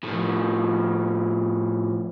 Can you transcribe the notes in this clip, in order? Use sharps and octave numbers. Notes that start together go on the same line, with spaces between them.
A2 F3